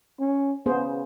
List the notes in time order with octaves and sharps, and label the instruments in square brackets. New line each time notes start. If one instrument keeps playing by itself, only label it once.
[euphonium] C#4
[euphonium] C#3 [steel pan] B3 G#4 C5